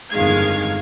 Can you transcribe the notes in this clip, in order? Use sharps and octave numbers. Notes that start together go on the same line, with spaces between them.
G1 F2 D#3 G#3 F5 G#6